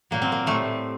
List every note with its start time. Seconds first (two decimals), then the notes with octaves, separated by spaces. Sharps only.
0.11 A#2 F#3 A#3
0.22 C4
0.32 A#3
0.46 A2 A3
0.50 G3